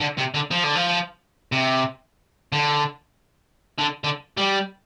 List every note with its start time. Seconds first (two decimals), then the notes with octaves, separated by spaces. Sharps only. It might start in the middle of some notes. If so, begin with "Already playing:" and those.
0.01 D3
0.18 C3
0.34 D3
0.51 F3
0.64 D3
0.75 F3
1.52 C3
2.52 D3
3.79 D3
4.04 D3
4.37 G3